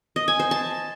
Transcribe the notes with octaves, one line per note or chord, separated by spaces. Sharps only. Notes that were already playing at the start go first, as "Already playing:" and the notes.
D#5
G#5
C5
A5